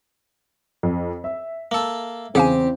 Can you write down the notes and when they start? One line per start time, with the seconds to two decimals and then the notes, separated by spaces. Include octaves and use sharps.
0.83 F2
1.24 E5
1.71 A#3 A4
2.35 E2 C#3 C4 G4 G#4 F5 G#5